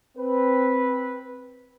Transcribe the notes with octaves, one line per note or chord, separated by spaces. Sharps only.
C4 B4